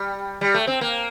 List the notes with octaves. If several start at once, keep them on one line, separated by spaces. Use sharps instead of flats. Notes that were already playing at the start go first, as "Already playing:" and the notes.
Already playing: G3
G3
A3
C4
A#3